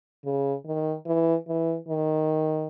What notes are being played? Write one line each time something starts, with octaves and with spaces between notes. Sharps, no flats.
C#3
D#3
E3
E3
D#3